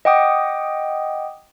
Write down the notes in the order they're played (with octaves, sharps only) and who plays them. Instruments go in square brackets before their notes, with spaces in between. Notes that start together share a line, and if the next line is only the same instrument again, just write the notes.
[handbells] D#5 F#5 G5 D6 D#6